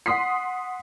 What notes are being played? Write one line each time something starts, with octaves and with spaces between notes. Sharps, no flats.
F#5 C6 D#6 B6 C7